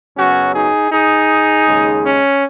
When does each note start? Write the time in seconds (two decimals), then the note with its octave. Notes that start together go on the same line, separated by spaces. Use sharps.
0.17 F#2 C#3 F#3 B3 C#4 F#4
0.54 D#4 G#4
0.92 D#4 G#4
1.66 D#2 C#3 G#3
2.04 C#4